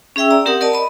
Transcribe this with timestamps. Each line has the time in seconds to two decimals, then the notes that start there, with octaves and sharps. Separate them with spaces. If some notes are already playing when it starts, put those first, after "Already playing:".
0.16 C#4 G#4 E5 G5 E6
0.30 D5 A#5
0.46 C4 G4 A#4 F#5 D#6
0.61 A#4 D5 D#5 A5
0.73 D#5 B5